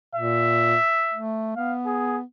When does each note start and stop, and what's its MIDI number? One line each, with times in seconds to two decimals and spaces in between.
0.15 0.76 46
0.15 1.24 76
1.14 1.54 57
1.56 2.22 59
1.56 1.75 77
1.86 2.17 68